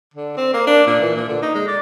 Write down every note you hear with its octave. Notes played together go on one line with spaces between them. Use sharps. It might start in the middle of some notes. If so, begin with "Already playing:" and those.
D3
C4
A#3
D4
A#2
E3
A#2
D3
D#4
G#3
D5